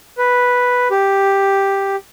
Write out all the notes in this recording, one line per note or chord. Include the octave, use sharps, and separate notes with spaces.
B4
G4